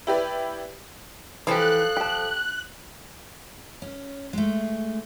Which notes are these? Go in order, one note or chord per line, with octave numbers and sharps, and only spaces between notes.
E4 G4 B4 D5
E3 F3 G4 A4 F#6
G4 A5
C#4
G#3 A3